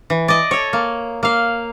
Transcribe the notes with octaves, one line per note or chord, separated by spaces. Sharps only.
E3
D5 D#5
A4 C#5
A#3
A#3 F5